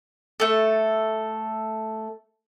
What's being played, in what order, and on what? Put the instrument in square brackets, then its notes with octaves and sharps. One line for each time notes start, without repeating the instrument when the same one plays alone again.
[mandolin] A3 A4